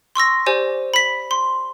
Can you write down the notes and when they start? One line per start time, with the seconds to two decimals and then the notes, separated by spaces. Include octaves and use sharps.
0.15 C6 C#6 E6 A#6
0.46 G4 C5 D5 G#5
0.94 B5 B6
1.31 C6